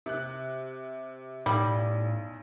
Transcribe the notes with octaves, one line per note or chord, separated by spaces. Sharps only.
C3 F#6
B1 A2 G3